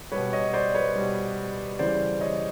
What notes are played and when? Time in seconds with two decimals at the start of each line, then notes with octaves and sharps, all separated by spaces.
0.12 B2 G3 B4 C#5
0.33 C#5 D#5
0.53 C5 D5
0.74 B4 C#5
0.95 B2 G3
1.79 C#3 E3 G3 C5 D5
2.21 C#5 D#5